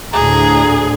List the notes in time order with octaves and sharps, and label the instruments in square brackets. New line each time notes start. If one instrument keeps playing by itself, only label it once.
[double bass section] D2 A2 D3 [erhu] G#4 [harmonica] A#5